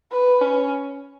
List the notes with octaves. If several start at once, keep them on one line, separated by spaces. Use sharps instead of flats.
B4
C#4